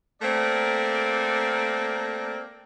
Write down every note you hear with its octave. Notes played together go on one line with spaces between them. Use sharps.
A3 A#3 C4 A#4 D5